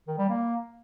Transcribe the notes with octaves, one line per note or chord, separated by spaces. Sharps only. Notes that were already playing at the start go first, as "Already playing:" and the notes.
D#3
G3
A#3